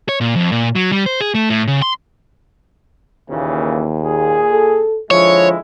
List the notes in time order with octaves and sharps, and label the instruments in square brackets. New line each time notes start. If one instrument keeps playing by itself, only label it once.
[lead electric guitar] C#5
A#2
F2
A#2
F#3
G3
C5
G#4
A3
A2
C#3
C6
[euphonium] D#2 [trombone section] A#2 C#3 E3
[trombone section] A#2 G#4
[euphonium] A4
[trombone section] D3 G#3 E4 [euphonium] F3 [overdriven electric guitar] C#5